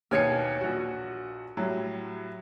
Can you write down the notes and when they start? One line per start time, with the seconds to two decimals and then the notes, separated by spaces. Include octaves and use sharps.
0.11 D#2 B2 A#4 C#5 G#5 C#7
0.61 A#1 F#4
1.57 A2 F#3 G3